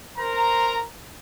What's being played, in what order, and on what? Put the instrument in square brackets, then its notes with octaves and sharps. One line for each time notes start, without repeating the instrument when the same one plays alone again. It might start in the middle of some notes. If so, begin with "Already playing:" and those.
[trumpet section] A#4 C5 A#5